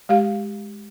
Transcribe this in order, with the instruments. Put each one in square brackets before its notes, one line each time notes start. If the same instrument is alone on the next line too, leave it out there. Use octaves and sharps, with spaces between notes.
[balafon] G#3 G4 F5